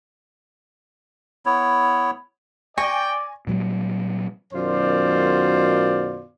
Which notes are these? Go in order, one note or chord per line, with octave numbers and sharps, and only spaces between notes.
B3 E4 C#5
D5 G5 G#5 C#6 A#6
A#2 F#3 G3
F#2 B2 D#3 F4 C5 D5